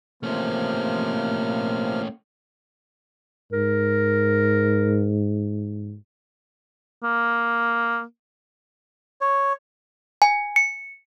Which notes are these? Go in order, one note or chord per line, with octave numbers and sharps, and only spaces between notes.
C3 F3 A3 A#3 C#4 F6
G#2 A#4
A#3
C#5
G#5
C#7